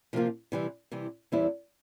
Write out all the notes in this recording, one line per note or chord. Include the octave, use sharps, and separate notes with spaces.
C3 F3 A#3 F4
C3 E3 G3
C3 E3 G3
E2 E3 G3 C4 E4